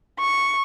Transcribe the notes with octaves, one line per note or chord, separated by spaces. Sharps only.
C#6